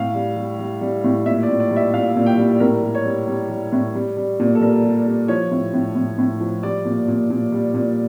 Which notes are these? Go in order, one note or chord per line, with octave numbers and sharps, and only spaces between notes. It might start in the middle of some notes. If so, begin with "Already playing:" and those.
Already playing: A2 F5
G3
G3
G3
G3
A2
A#2 E5
D5
A#2
D5
G3
E5
A#2 F5
A#2
G5
G3
A2 A#4
G3
C#5
G3
G3
G3
A2
G3
G3
A#2
A4
G3 A#4
G3
G3
F3 C#5
A2
A2
A2
A2
F3
G3 D5
A#2
A#2
A#2
G3
A#2